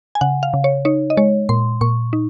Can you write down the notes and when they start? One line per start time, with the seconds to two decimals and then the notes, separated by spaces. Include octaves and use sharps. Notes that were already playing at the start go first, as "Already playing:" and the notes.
0.15 G#5
0.21 C#3 F#5
0.43 F5
0.54 C#3
0.64 C#5
0.85 D#4 C#5
1.10 D#5
1.17 G#3 C#5
1.49 A#2 C6
1.81 A#2 C#6
2.13 D#4